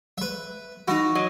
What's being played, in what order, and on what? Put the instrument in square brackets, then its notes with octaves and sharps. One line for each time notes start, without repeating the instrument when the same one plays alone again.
[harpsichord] B4 E5
[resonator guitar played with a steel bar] E3 D#4 [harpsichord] F#4
[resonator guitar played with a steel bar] F#3 D#5